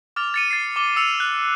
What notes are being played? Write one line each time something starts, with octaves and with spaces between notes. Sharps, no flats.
D6 F6 A6 F7
A6 C#7 D#7
A6 C7
D6 G7
E6 C#7 D#7 F7
F#6